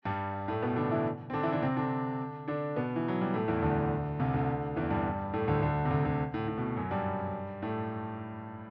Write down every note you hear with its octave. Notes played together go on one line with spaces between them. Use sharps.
G2 G3
A2 A3
B2 B3
D3 D4
E3 E4
C4
D3 D4
E3 E4
D3 D4
C3 C4
D3 D4
D3 D4
B2 B3
E3
F#3
G3
A2 A3
E2 E3
D2 D3
C2 C3
D2 D3
E2 E3
G2 G3
A2 A3
D2 D3
D2 D3
C3
D2 D3
D2 D3
A2
A2
B2
F#2 F#3
G2 G3
A2 A3